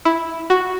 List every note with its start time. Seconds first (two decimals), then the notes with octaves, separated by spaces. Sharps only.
0.05 E4
0.50 F#4